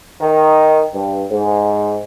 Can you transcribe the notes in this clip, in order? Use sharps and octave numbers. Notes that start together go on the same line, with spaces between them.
D#3
G2
G#2